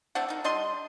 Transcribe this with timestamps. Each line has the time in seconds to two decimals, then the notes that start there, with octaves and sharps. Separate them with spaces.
0.15 A3 C4 D4 F#5
0.29 D#3 D#4
0.44 G3 D4 D#5 C6